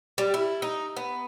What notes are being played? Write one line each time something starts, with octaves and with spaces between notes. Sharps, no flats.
G3
E4
D#4
B3